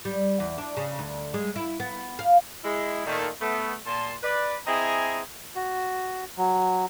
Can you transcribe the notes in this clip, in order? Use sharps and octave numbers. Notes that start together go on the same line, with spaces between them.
G3
E2
D4
C#3
D2
G#3
E4
B3
F5
G#3 E4
A#2 D#3 A3
A3 B3
A#2 A5 C6
B4 D5
C4 E4 G#4 D#5 G#5 A#5
F#4
F#3